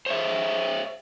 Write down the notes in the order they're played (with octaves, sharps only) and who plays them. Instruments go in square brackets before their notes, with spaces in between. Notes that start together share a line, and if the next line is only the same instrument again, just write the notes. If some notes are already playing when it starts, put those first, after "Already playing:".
[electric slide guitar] C5 C#5 E5